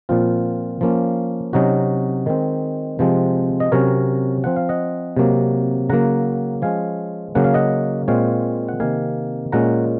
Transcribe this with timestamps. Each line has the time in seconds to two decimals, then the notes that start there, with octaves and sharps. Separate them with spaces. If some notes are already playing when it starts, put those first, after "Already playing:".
0.09 A#2 F3 C4 F4
0.81 F3 A#3 C#4
1.53 C3 F#3 C#4 D#4 F#4
2.26 D#3 G#3 C4
2.99 C3 F3 G#3 C4
3.60 D#5
3.72 C3 F#3 C#4 A#4 C#5
4.44 F3 C4 F#5
4.56 F5
4.69 D#5 F#5
5.17 C3 F#3 A#3
5.89 C#3 F#3 A#3 F#5 A#5
6.62 F3 G#3 C#4 F5 G#5
7.35 C#3 F#3 A#3 C#4 F#5
7.44 F5
7.54 D#5 F#5
8.08 A#2 G#3 C4 C#5 F5
8.69 F#5
8.80 C3 D#3 A#3 F5 G#5
9.52 A#2 G#3 C#4 F#5 A#5